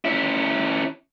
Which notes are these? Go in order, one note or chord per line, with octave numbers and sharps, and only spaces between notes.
C#4 E4